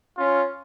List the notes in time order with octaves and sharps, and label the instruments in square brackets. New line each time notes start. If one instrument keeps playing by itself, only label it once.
[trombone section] C#4 [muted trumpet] F4